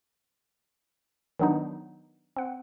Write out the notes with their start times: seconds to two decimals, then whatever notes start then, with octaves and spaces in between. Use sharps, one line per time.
1.39 D#3 F#3 B3 D4 D#4
2.36 C4 F#5